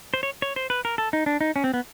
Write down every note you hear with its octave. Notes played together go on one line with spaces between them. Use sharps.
C5
C#5
C#5
C5
B4
A#4
A4
D#4
D4
D#4
C#4
C4
B3